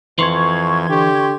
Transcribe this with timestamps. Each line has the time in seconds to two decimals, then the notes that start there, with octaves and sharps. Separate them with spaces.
0.19 F2 E3 C6 C#6 G#6
0.89 D3 G4